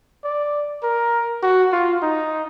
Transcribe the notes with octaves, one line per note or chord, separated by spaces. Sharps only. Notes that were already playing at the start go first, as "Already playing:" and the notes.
D5
A#4
F#4
F4
D#4